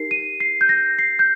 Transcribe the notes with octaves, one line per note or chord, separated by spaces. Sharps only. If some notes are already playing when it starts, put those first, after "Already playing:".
Already playing: D#4 G4 A#4 C7
D#7
C7
G6
A#6
C7
G6